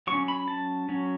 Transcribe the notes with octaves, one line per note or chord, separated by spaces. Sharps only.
F#3 C#4 C#6
B5
A5
F#3 C#4